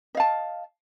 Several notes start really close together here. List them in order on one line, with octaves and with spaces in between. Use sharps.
D#5 F5 A5